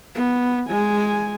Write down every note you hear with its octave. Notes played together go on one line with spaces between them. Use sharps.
B3
G#3 G#5